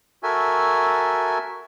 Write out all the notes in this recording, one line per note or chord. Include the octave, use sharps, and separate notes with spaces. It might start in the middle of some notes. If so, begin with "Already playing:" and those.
F#4 A4 A#4 E5 G#5